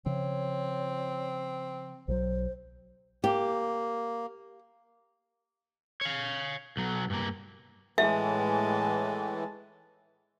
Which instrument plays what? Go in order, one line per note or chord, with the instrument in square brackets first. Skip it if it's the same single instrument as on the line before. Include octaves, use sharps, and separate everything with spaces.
[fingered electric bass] C#3 F3 [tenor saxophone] C4 [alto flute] C#5
[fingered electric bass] B1 E3 F#3 [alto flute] C5
[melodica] A#3 [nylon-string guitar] G4
[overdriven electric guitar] C#5 F5
B1 F#3
G2 A#3
[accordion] A2 E3 [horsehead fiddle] G#3 A5 [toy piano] E5